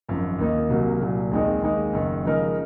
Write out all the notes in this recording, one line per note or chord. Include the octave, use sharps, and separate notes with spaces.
G#1 F#2 F3
D#2 D#3 A#3 D#4
C2 C3 F#3 A#3
C2 A#2 F#3
D#2 D#3 G#3 C4 D#4
D#2 D#3 G#3 D#4
F#1 F#2 D#3
C#3 F3 G#3 D#4 A#4